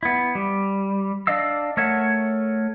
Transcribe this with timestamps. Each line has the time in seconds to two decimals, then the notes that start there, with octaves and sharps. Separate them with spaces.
0.03 B3 E4
0.35 G3
1.27 D4 D5 D#5 F5 E6
1.77 A3 A#4 C#5 E5 F#5